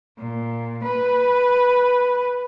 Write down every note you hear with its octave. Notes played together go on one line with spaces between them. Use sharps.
A#2
B4